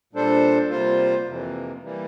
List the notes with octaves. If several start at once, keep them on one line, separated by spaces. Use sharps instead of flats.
A#2 G3 D4 A4 C5
C3 G3 A#3 F4 C5
F2 C3 E3 A#3
E3 G3 A#3